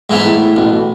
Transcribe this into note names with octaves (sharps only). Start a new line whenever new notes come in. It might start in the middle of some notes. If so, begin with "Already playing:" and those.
G#2 E3 B3
A2
A1 B2